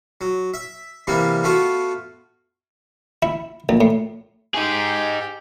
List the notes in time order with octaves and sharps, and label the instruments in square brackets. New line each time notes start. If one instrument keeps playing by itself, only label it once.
[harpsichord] F#3
E5
C3 E3 G3 A#3 B3
A3 B3 F4 F#4
E4
A#1
A2
[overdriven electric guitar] D#4 G#4 [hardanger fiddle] G4